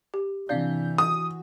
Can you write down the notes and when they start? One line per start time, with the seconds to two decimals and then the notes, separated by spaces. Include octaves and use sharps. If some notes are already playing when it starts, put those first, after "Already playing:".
0.14 G4
0.49 C3 E3 D4 D5 F5 G6
0.98 F#4 D#6